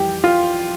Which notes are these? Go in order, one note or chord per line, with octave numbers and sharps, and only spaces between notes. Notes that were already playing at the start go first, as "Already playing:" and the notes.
Already playing: F2 E3 G3 G4 G5
F4 F5